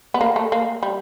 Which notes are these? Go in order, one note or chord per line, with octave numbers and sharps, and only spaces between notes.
B3
A#3
A3
A#3
G3